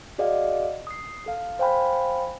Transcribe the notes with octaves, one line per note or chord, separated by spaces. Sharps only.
F#4 G#4 D5 D#5 F5 F#5
D#6 C7
A4 F5
C5 F5 G5 G#5 B5